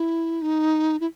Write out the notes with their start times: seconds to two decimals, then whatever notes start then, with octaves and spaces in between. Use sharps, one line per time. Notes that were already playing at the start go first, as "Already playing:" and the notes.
Already playing: E4
0.42 D#4
1.01 E4